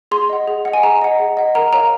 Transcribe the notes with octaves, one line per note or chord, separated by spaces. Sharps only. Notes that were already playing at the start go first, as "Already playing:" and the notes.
G#4 C6
D#5 F#5
G#4
D#5 F#5
G#5
G#4 A#5
D#5 F#5
G#4
D#5 F#5
A#4 A#5
C#5 F5 A#5